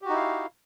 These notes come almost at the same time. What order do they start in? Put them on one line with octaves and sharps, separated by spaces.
G4 F#4 D#4 E4 F5